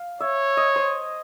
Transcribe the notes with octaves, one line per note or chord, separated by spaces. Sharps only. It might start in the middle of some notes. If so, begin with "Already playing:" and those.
Already playing: F5
C#5 E5
D#5
C5